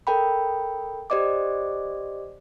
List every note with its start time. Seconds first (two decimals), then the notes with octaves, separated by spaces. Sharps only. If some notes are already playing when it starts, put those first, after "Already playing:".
0.07 A4 A#4 G5 B5
1.10 G4 C5 D5 D#5 D6